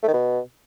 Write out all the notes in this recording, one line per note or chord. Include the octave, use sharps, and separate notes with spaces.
A3
D#3
B2